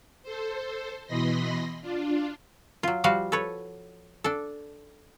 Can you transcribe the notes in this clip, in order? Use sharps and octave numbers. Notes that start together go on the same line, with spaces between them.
A4 C5
B2 E3 D#5 B5 C6 A#6
D4 F4
F#3 F4
F3 G3 F#4 F5 F#5
A4 B4 C#5
D4 A4